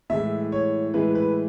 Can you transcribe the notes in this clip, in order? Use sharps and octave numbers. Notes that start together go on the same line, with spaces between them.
A2 E3 G#3 E5
C#5
A2 E3 G#3 B4
B4